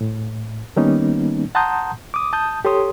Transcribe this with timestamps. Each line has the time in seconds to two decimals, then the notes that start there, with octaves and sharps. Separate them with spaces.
0.01 A2
0.76 D#3 G3 A#3 B3 C#4 D#4
1.55 F#5 A5 A#5 C6 D#6 G6
2.14 D6 D#6
2.33 A5 D#6 G6
2.65 G4 A4 C#5 C6 D#6